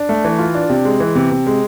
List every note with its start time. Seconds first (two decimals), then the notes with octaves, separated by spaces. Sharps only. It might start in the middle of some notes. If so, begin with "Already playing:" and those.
Already playing: D4
0.09 A3
0.24 E3
0.39 F4
0.55 D4
0.70 C3
0.85 G#3
1.00 E3
1.15 C3
1.31 C3
1.47 G#3